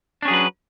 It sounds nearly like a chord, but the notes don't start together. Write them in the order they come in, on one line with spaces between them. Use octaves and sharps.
D4 C#4 G#4 F#3 B4